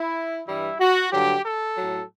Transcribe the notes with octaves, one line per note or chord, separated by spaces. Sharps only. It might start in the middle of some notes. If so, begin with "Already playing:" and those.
Already playing: E4
G2 E3 G3 E4
F#4
G2 D3 F#3 G4
A4
A2 F#3